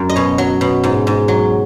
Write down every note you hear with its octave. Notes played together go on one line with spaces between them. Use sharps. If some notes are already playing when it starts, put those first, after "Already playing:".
Already playing: F#2
D#5
B2 C#5
F#3
B2
G#2
G#2
F#3